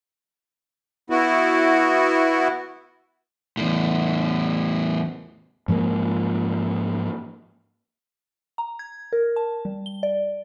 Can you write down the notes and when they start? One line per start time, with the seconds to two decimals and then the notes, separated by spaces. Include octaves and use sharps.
1.10 B3 E4 F#4
3.57 E2 A2
5.68 G#2 F3 G#3 A#3
8.58 A#5
8.79 G#6
9.13 A#4
9.36 A5
9.65 G3
9.86 G7
10.03 D5